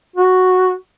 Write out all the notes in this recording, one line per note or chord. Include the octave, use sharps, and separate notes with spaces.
F#4